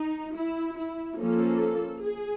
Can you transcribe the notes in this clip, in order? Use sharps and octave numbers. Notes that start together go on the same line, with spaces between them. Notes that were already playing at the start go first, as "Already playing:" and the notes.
Already playing: D#4
E4
E4
F3 A#3 C#4 A4
G#4